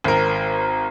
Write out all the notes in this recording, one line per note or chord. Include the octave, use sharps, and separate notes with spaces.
G#1 A#4